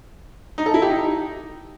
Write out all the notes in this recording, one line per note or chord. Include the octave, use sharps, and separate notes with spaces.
D#4
A4
E4
G4
D#4